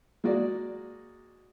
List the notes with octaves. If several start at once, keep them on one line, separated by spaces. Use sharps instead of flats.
G#3 A#3 F#4 D5